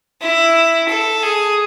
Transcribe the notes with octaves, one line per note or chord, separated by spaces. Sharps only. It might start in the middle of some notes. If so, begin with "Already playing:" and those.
E4
A4
G#4